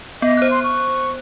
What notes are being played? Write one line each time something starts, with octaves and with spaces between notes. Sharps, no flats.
B3 D#5
C5 F#6
C6
C#6